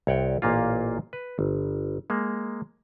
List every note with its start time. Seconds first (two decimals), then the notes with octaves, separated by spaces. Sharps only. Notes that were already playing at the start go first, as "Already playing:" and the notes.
0.07 C2 C#5 F#5 G5
0.42 A1 A#2 A#3 F4
1.13 B4
1.39 G1
2.10 G#3 A#3